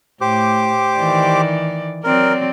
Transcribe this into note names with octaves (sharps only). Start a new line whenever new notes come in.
A2 G4 C5 D6
D#3 E3 D5
F#3 C4 A#4 D5